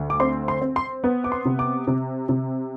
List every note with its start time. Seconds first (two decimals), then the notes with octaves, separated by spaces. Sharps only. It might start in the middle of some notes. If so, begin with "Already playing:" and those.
Already playing: D2
0.10 D6
0.20 C4 C6
0.48 C6
0.62 C4
0.76 C6
1.04 B3
1.24 D6
1.32 C6
1.45 C3
1.59 D6
1.87 C3
2.29 C3